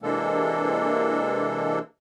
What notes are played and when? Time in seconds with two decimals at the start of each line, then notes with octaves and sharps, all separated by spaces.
0.03 C3 E3 G#3 A#3 D4 A4